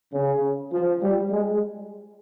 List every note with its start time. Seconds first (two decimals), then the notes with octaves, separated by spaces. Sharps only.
0.13 C#3
0.72 F3
1.02 G3
1.31 G#3